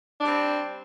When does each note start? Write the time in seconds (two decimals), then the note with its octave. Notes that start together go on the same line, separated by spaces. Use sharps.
0.20 D4
0.24 G3
0.27 C4